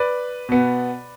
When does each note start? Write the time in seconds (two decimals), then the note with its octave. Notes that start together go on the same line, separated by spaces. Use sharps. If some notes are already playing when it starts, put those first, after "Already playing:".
Already playing: B4 D5
0.49 B2 B3